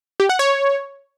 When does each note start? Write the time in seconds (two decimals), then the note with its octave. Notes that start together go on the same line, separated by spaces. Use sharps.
0.20 G4
0.29 F#5
0.39 C#5